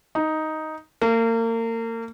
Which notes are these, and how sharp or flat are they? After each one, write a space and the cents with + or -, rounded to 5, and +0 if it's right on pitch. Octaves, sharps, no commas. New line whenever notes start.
D#4 +5
A#3 -35